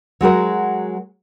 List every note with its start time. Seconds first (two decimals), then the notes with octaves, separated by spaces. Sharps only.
0.21 F#3 G#3 F#4 A#4